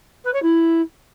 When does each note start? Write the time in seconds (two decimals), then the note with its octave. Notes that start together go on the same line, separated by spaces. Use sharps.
0.24 B4
0.33 C#5
0.42 E4